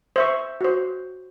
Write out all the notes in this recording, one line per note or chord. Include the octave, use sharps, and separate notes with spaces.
C5 E5 C#6
F#4 C5